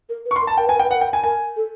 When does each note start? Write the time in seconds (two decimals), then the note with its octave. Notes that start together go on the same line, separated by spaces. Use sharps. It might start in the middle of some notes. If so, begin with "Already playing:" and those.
0.09 A#4
0.25 B4
0.31 C#6
0.36 C6
0.41 A#4
0.47 A5
0.57 A#4 G5
0.67 B4 G#5
0.76 A#4 G5
0.85 B4
0.91 F#5
0.95 A#4
1.01 G5
1.13 G#5
1.24 A#4 G#5
1.56 A4